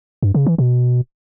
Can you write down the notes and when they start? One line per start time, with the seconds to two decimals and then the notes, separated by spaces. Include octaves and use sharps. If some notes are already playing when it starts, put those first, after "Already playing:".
0.23 G2
0.35 C#3
0.46 E3
0.58 B2